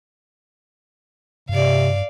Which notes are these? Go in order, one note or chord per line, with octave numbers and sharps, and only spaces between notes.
G2 C3 D5 F5